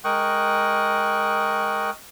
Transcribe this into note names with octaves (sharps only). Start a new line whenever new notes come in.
G#3 A#4 G5 C#6 D#6 F#6